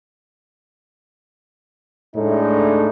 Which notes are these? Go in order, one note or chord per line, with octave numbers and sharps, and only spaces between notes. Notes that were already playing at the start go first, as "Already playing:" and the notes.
A2 G#3 A3 D4 D#4